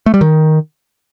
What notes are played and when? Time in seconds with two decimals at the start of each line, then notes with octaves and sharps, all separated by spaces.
0.06 A3
0.14 G3
0.21 D#3